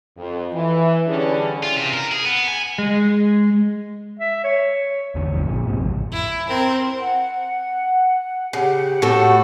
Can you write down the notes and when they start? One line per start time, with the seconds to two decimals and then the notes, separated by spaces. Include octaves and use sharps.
0.18 F2
0.53 E3
1.08 D3 E3 G3 C#4 D4 G#4
1.63 F4
1.77 C3
1.94 A#4
2.12 G#4
2.25 B3
2.48 G#5
2.78 G#3
4.19 E5
4.44 C#5
5.15 E2 D3
5.32 D#1 G#1 F#2 F3
5.48 A#2 F3
5.67 G#2 C3
5.78 A1 F2
6.12 E4
6.49 C4 A#4
7.00 F#5
8.53 C#3 G4 F#5
9.02 A2 F#4 A4